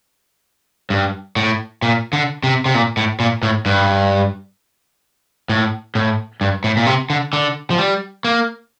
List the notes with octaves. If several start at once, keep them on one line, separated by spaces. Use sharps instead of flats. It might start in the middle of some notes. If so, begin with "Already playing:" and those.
G2
A2
A#2
D3
C3
C3
A#2
A2
A#2
A2
G2
A2
A2
G2
A2
A#2
C3
D3
D3
F3
G3
A#3